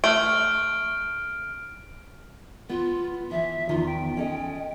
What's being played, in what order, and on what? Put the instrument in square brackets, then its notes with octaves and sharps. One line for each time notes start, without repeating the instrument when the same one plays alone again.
[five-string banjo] A3 [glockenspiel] F6 D7
[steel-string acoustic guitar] B3 [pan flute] F4
[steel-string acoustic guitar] E3 F3 [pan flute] E5
[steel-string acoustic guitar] E2 D#3 F3 [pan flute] F4
[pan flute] G5
[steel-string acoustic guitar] C#4 A4 D#5